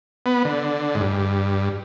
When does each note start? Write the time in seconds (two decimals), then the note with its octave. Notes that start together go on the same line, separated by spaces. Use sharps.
0.26 B3
0.45 D3
0.95 G#2
1.01 G2